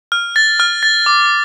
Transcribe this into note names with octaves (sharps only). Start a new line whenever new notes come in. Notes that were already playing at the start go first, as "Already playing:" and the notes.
F6
A6
F6
A6
D6